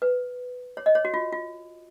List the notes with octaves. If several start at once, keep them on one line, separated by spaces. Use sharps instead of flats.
B4
C#5
D#5
C#5
F#4
F4
F4